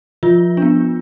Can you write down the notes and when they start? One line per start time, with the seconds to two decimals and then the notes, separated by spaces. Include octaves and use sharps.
0.23 F3 F4
0.57 B3 D4